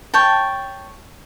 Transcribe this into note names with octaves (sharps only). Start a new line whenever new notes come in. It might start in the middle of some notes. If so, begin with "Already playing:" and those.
C#5 G5 A5